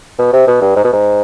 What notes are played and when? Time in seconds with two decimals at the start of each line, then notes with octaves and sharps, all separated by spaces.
0.18 B2
0.33 C3
0.47 B2
0.61 G2
0.76 G#2
0.84 B2
0.93 G#2